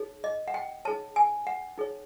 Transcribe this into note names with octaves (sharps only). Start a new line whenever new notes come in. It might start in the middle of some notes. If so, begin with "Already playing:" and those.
Already playing: D#4 G#4 C#5
D#5
F#5
G5
D#4 G#4 C#5 A5
G#5
F#5
D#4 G#4 C#5